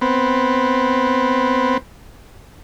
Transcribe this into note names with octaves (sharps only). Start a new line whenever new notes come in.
B3 C4